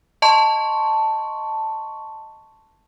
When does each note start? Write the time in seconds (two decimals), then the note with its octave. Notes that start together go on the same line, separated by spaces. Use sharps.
0.22 D#5 A5 C6 C#6